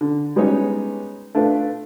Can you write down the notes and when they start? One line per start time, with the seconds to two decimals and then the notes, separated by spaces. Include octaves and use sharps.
0.01 D3
0.36 G3 G#3 B3 C#4 D#4 C#5
1.35 A3 D4 F4 B4